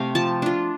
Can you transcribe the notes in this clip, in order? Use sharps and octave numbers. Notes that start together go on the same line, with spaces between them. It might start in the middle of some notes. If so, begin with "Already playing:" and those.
Already playing: C3 A3 C4 F5
F3 A5
D4 F4